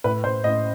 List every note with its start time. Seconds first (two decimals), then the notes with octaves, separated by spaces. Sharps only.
0.04 A2 B4
0.24 A2 C5
0.44 A2 D#5